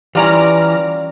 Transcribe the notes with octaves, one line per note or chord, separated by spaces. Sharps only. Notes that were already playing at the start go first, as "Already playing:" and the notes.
E3 G3 C#4 F4 D5 A#5 F6